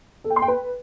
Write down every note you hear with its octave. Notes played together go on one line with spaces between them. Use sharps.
A4
G5
C6
G5
B4